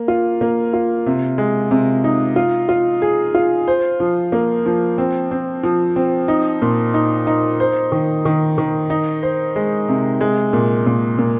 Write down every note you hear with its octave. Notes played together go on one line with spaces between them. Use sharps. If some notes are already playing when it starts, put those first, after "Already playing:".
Already playing: A#3
F4
A#3
F4
C3
G#3
C3
D#4
F4
F4
G#4
F4
C5
F3
A#3
F3
C4
C4
F3
C4
D#4
A#2
D#4
D#4
C5
D#3
D#3
D#3
D#4
C5
G#3
C3
G#3
A#2
A#2
A#2